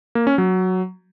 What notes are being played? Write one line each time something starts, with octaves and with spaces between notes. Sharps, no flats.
A#3
C#4
F#3